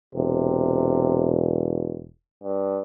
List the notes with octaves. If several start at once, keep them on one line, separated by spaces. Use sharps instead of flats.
E1 C3
G2